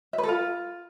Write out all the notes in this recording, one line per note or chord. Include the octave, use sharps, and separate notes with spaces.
E5
B4
A4
F4